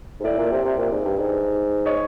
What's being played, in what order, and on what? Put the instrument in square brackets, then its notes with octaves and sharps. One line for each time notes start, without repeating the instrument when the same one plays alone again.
[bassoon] G#2
[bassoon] A2 [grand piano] D5 E5
[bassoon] A#2
C3
C3
A#2
G#2
G2
G#2
[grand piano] C#5 D#5